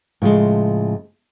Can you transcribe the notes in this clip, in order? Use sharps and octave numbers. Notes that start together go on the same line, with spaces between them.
A2 C#3 F3 G3 G#3